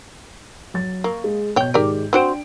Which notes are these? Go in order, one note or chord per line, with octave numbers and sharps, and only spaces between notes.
F#3 A6
A#3 C#6
G#3
B2 C#5 G5 G6
G#2 D#3 G#3 G4 A#4 D5
C4 D4 F#4 C5 G5 D7